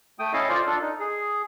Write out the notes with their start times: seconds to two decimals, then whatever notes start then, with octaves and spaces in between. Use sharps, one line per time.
0.19 A3 G5 D#6
0.33 C#4 E4 A4 D#5 F5 A5
0.49 F4 C5 D5
0.67 D4 F4 A4
0.81 D#4
1.00 G#4